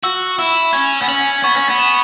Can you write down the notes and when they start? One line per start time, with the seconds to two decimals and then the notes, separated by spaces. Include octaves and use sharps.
0.03 F#4 E6
0.39 E4 E6
0.73 C#4 G#6
1.02 B3
1.08 C#4 F#7
1.43 B3 C#6
1.56 C#4
1.69 B3
1.79 E7